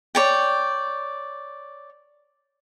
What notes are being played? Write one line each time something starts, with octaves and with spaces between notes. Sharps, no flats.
C#5 D5 G5